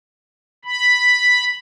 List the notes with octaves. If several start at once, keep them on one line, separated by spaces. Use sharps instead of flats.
B5